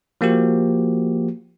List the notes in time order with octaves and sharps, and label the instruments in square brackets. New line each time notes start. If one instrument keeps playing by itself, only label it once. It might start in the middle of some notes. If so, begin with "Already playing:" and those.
[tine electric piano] F3 A#3 F#4 G4